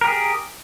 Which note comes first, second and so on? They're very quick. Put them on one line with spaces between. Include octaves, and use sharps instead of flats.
A#4 G4 G#4